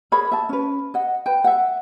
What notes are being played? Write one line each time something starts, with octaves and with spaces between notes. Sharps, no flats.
G#4 A#4 C#5 B5
E5 A5
C#4 B4
D#5 F#5
B4 G5
E5 F#5